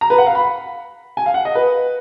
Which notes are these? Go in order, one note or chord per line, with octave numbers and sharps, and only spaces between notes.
A#5
B4
F#5
F5
B5
G#5
F5
F#5
D#5
B4